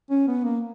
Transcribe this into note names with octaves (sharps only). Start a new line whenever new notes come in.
C#4
B3
A#3